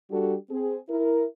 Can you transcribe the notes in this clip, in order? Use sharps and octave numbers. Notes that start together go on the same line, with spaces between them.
G3 D4 F#4 G4 A4
C4 G#4
E4 A#4